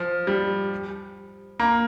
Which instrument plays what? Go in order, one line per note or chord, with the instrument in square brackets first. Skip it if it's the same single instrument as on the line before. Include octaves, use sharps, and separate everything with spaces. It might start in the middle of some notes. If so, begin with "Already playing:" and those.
Already playing: [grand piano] F3
G3
A#3